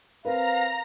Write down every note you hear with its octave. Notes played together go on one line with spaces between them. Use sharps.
C4 A#4 B4 F5 A#5